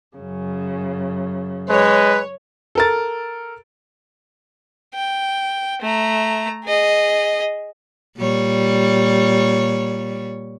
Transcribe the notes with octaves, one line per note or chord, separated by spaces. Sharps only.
F#2 C#3
G#3 B4 C#5
A4 A#4 A6
G5
A3 A#5
G#4 D#5
A#2 G3 C#5